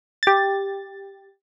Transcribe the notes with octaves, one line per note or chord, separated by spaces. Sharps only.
G4 A6